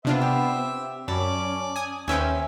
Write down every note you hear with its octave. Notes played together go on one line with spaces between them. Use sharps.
C3 B3 D4 F4 C5 E5
G4
C4
F#2 C#4 D5 A5 B5
G#5 D#6
D#2 C#4 B4 C5 E5 G5 G#5